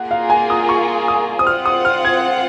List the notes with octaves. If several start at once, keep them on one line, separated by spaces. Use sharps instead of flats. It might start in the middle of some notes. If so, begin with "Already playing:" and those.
Already playing: A#3 F4 G#4 F#5
F5
G#5
D#6
C#6
D#6
D#6
C4 F4 C5 F#5 F6
D#6
F6
G#6